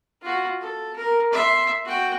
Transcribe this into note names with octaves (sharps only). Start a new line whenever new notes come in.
F4 F#4
A4
A#4
E5 C6
F#4 G5